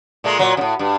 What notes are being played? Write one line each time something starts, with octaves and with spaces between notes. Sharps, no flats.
A#2 G#3 A3
A#2 F#3
F#2 A2
G2